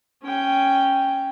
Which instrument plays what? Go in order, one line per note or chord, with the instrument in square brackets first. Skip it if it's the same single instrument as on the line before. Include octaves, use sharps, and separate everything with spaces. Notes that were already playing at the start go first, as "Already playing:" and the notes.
[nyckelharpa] C#4 G5